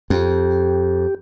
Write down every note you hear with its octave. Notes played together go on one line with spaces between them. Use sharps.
F2 G4